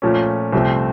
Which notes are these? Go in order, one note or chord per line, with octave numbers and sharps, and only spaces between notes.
A#2 F3 A3 C#4
C2 C3 F3 A3 C4